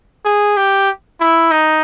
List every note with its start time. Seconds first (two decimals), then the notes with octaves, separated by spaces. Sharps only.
0.25 G#4
0.57 G4
1.20 E4
1.51 D#4